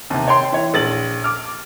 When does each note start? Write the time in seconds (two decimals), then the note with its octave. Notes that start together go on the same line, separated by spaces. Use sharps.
0.10 D#2 C3
0.28 C#5 G5 C6
0.52 E3 C#5
0.74 A#1 A6 F#7
1.24 D6 F6